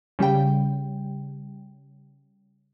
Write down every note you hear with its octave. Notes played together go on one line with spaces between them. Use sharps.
C#3 G3 G4 G5